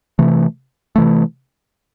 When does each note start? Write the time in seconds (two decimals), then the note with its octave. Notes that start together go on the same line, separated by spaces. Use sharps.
0.19 C3 E3 A3
0.96 C3 E3 A3